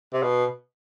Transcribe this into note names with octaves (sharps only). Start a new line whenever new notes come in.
C3
B2